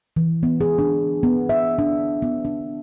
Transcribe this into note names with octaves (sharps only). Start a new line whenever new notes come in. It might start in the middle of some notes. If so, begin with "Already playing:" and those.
E3
B3
G#4
D4
B3
E5
D4
B3
D4